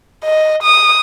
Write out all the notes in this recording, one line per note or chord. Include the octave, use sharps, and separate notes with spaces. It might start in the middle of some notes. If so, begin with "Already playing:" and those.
D#5
D#6